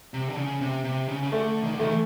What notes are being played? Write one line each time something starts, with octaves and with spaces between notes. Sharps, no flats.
C3
D3
C#3
C3
C3
C#3
C#3
D3 A3
D#3
D3
D#3 A3
E3